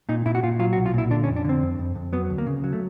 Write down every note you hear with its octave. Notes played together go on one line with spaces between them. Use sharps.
A#2 D#4
A#2 E4
F#4
A#2 F4
F#3 F4
F#4
B1
F4
A#2 E4
D3 D4
C#4
F2
D4
D3 C4
F2
F2
F2
F#3 B3
D2
A#3
C#3
F#3
A3